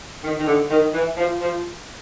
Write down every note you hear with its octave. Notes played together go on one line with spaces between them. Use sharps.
D#3
D#3
D3
D#3
E3
F3
F3